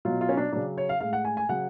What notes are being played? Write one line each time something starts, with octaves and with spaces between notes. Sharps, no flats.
B2 F#3 F4
F4
C#4
D4
C#3 F#3 D4
C#5
F5
A2 G#3 F5
F#5
G#5
G#5
C#3 F#3 F#5